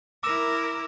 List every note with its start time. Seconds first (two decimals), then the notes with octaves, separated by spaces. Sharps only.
0.23 E4 A#4 D6 E6 E7